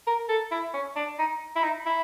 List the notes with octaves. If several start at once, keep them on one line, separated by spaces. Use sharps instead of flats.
A#4
A4
E4
C#4
D4
D#4
E4
D#4
E4